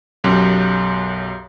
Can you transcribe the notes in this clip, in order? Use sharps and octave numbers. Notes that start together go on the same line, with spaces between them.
B1 F#2 G4